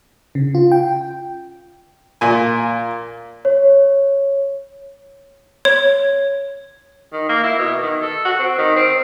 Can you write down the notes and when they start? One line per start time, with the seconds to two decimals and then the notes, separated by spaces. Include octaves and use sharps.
0.35 C#3
0.55 F4
0.72 G5
2.21 A#2 G#5
3.45 C#5
5.65 C#5
7.12 D#3
7.29 A#3
7.43 E4
7.58 B2
7.82 D#3
8.02 A4
8.25 F#4
8.39 C4
8.58 D#3
8.76 C4